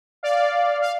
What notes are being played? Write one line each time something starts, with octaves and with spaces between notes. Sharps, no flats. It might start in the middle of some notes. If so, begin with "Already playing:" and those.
D5 F5
F5